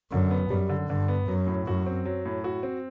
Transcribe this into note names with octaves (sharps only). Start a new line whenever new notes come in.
F#2 D3
B3
F#2 G3
D3
G2 D3
B3
F#2 F#3
A2
F#2 F#4
C4
F#3
A2
F#4
C4